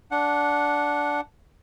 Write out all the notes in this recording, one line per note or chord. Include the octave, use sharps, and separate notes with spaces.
D4 F#5